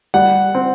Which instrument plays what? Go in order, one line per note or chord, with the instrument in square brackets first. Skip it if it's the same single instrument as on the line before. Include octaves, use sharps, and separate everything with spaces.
[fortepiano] G3 F#5
C4